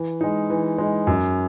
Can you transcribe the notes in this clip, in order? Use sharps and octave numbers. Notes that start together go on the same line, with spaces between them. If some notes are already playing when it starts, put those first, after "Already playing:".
Already playing: E3
G#3 D#4
E3
G#3 D#4
F#2